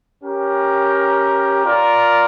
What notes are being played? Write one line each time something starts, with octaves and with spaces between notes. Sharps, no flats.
C#4 G4 A#4
F4 A#4 D5